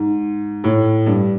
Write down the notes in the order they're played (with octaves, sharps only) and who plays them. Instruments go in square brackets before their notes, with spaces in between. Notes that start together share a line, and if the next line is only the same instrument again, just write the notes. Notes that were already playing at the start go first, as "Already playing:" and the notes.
Already playing: [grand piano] G#2
A2
G2